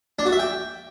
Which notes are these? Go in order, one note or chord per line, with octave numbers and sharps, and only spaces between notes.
D4
F#4
E5
G5